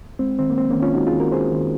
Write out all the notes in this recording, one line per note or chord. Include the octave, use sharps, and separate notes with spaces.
G#3 C4
D#3 C4
A#3
G#3 C4
A#3 C#4
D#3
C#4 F4
G#3 D#4 F#4
F4 G#4
D#3
F#4 A#4
G#3 G#4 C5
D#3